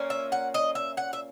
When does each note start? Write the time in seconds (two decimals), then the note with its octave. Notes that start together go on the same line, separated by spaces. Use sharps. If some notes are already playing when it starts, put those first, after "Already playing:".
Already playing: A#2 A#3 C#4
0.10 E5
0.32 F#5
0.54 D#5
0.75 E5
0.97 F#5
1.13 E5